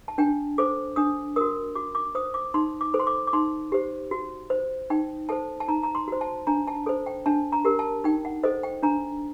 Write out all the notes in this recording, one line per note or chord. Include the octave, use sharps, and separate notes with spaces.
A5
D4 G5
A4 C5 D6
D4 D#6
F#4 A#4 D#6
F#4 D6
D6
C5 D#6
D6
D#4 C6
D6
A4 C5
C6
D6
D6
D#4 C6
G4 C5
F#4
C5
D#4 G5
A4 C5 A5
A5
D#4 A#5
A#5
C6
F#4 C5
A5
D4 A#5
A5
A4 C5
G5
D4 A5
A#5
G4 A#4
A5
D#4 G5
F#5
A4 C5 D#5
G5
D4 A#5